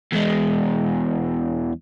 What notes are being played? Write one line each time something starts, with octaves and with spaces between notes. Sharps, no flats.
E2 G#3